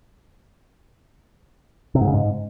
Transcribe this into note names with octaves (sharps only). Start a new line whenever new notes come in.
C3
G#2
C#3
G#2